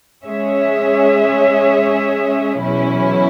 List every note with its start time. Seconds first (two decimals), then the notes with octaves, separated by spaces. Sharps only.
0.24 G#3 C#4 G#4 C#5 E5
2.62 E2 B2 F#3 C#4 E4